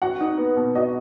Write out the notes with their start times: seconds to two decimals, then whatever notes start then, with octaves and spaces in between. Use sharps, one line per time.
0.02 F#4 F#5
0.21 D#4
0.38 B3
0.56 B2
0.75 F#4 D#5